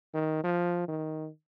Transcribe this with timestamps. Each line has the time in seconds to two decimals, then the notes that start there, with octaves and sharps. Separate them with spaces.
0.14 D#3
0.44 F3
0.88 D#3